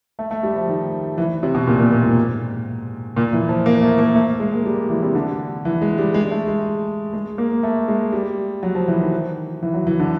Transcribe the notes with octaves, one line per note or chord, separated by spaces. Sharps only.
A3
A3
G3
F3
D#3
E3
C3
B2
A#2
A#2
A#2
G#2
A#2
E3
F3
A#3
A3
A#3
A3
G#3
A#3
G3
E3
C3
D3
E3
G#3
G3
G#3
A3
G#3
G#3
A#3
A3
G#3
G3
F#3
F3
E3
D#3
E3
F#3
E3
D3